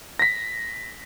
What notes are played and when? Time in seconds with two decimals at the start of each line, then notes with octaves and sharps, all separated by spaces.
0.19 A#6 B6